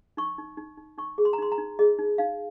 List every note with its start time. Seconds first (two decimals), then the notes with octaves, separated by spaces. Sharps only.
0.17 D#4 C#6
0.38 D#4
0.57 D#4
0.77 D#4
0.98 D#4 C#6
1.18 G#4
1.25 C6
1.33 A#5
1.38 D#4 C6
1.52 A#5
1.58 D#4
1.79 G#4 D#5
1.99 D#4
2.18 D#4 F5